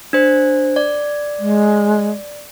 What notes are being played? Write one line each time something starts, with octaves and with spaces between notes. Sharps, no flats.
D4 C5
D5
G#3